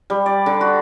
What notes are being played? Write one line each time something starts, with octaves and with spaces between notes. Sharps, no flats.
G3
D5
D3
F#4